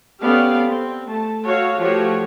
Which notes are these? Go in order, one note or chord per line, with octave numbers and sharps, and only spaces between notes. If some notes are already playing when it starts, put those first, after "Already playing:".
B3 C#4 G4 A4 D5 F5
C4
A3 A5
F#4 A4 C#5 F5
F3 A3 F#4 G4 C#5